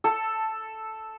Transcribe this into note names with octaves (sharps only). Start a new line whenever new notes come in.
A4